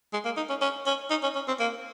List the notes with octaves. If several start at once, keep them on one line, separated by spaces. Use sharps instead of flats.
G#3
A#3
D#4
C#4
C#4
C#4
D#4
C#4
C#4
C4
A#3